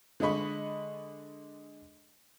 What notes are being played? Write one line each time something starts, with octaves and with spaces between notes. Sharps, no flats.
D3 G#3 D#5 B5 C#6